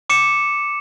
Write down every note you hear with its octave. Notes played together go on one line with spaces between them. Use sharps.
D6 C#7 E7